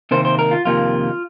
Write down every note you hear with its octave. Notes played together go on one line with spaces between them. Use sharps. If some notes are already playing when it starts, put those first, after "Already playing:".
C3 D#3 A#3 C5
C5
A#4
F4
F2 C3 D#3 A#3 F4